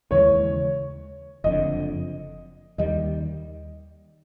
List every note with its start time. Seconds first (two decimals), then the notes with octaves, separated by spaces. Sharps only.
0.11 D#2 C#3 E3 G#3 C#5
1.44 F#1 F2 D3 D#5
2.78 D#2 D#3 G3 D#5